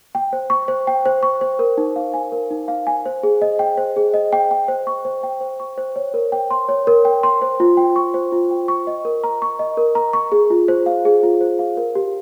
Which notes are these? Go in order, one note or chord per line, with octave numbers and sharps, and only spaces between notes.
G5
C5
C#6
C5
G5
C5
C#6
C5
A#4
D#4
F5
G#5
A#4
D#4
F5
G#5
C5
G#4
D#5
G5
C5
G#4
D#5
G5
G5
C5
C#6
C5
G5
C5
C#6
C5
C#5
A#4
G5
C6
C#5
A#4
G5
C6
C5
F4
G5
C#6
C5
F4
G5
C#6
D#5
A#4
A#5
C#6
D#5
A#4
A#5
C#6
G#4
F4
C5
F5
G#4
F4
C5
F5
A#4
G4